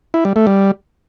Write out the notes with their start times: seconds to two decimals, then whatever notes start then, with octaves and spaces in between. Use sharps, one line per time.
0.14 E4
0.25 G3
0.36 A3
0.47 G3